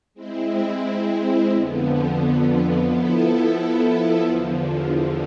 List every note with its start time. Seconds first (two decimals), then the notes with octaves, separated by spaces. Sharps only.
0.14 G#3 C4 E4
1.50 F2 D3 F3 B3
2.86 F3 B3 E4 A4
4.22 E2 D3 F3